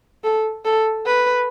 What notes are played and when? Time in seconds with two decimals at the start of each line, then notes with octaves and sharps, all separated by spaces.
0.24 A4
0.65 A4
1.06 B4